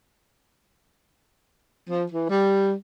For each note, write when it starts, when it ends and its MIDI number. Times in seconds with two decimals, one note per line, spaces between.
1.88 2.04 53
2.10 2.29 52
2.29 2.72 55